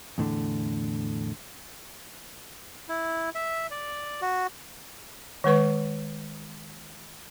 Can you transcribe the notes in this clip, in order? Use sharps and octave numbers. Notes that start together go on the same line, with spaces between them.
E2 A2 D3
E4
E5
D5
F#4
D#3 G#3 B4 C#6